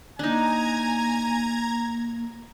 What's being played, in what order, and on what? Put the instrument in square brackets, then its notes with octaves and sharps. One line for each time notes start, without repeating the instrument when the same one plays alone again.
[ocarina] A#3 [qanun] D4 D#4 [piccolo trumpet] G#5 [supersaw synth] A#5 G#6